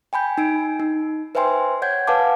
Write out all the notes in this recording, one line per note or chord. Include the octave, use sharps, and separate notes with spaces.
G5 G#5 B5 G6
D#4 G#5 D7
D#4
B4 C5 E5 G5 G#5 C6
C#5 F#5 G6 G#6
B4 F5 F#5 G#5 A5 D6